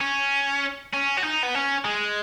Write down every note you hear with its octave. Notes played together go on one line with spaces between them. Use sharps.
C#4
C#4
F#4
D#4
B3
C#4
G#3